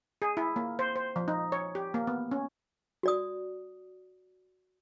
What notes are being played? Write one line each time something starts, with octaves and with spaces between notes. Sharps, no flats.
G#4
E4
A#3
C5
C5
F3
D#4
C#5
G4
A#3
B3
C#4
F#4 D5 D#6